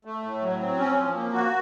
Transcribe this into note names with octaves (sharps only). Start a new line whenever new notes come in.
A3
A2
F#3
C4
C#4
F3
A#3
F#4